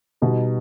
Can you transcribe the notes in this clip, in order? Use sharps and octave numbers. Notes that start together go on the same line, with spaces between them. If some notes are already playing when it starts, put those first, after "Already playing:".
B2 G3 B3 D#4